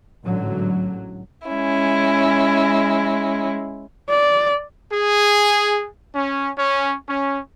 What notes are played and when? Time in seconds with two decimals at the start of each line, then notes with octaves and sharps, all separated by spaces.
0.24 A1 G#2 D3 F#3
1.48 G#3 C#4 E4
4.10 D5
4.93 G#4
6.15 C#4
6.58 C#4
7.09 C#4